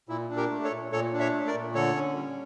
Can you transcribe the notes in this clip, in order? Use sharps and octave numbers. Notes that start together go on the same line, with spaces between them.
A#2 E4
D4
G4 A#4
A3
A4 C#5
A#2
A#2 A4 C#5
D4
C#5 E5
A3
A#4 D5
A#2
D3 A4 C#5
C#4
G3